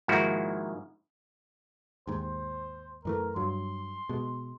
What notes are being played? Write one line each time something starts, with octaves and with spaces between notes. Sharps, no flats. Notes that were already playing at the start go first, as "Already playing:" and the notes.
G#2 D#3 F3 A#3 E4 F#4
D#2 G#2 C5
F#2 E3 A3 A#4
G2 F#3 C6
B2 G#3